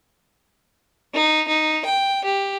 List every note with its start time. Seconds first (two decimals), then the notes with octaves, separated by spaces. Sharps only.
1.14 D#4
1.48 D#4
1.85 G5
2.25 G4